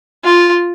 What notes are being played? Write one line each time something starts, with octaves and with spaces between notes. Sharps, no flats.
F4